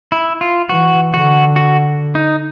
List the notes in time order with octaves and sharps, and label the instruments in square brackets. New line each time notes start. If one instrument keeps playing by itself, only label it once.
[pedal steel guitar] E4
F4
[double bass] E3 [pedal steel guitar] F#4
[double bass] D3 [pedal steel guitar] F#4
[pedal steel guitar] F#4
D#4